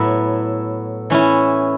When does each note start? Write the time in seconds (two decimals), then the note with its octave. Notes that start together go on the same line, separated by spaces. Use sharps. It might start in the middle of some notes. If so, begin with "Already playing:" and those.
Already playing: A2 F#3 B3 E4
1.10 E3 C#4 E4